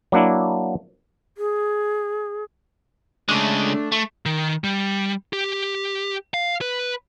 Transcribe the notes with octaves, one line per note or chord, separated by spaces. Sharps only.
F#3 A#3 D4 E4
G#4
C#3 G#3 A3 D4
A3
D#3
G3
G4
F5
B4